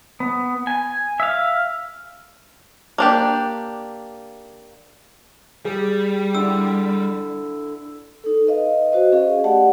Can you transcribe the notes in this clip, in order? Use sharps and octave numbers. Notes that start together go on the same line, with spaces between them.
B3
G#5
E5 F5
A#3 D4 G4
G3 G#4
D3 E4 E6
D#4 A4
B4 D#5 F5
F#4 C5 D#5
C#4 G#4 D#5 F5
A3 G4 D5 F#5 A5